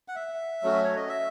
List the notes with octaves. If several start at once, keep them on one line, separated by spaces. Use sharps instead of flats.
F#5
E5
F#3 A3 C#4 F#4
C#5
D#5
E5